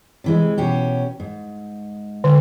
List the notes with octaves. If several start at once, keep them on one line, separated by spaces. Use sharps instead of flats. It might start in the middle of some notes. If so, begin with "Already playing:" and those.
C3 E3 G#3
B2 C#4 G4
G#2
D3